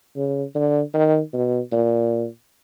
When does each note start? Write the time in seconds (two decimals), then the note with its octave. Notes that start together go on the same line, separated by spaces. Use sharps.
0.16 C#3
0.54 D3
0.94 D#3
1.33 B2
1.72 A#2